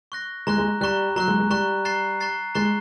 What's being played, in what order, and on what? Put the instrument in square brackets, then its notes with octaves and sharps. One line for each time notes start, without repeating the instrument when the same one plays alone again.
[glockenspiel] C#6 F#6 A#6
[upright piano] G#3 [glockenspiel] A#5 C#6 F#6
[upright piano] G#3
[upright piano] G3 [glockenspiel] A#5 C#6 F#6
[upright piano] F#3 [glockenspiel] A#5 C#6 F#6
[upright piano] G#3
G#3
[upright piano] G3 [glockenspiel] A#5 C#6 F#6
[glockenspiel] A#5 C#6 F#6 A6 C7
A#5 C#6 F#6 A6 C7
[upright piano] G#3 [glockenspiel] A#5 C#6 F#6 A6 C7